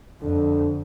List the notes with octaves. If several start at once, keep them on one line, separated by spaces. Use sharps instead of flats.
F2 D3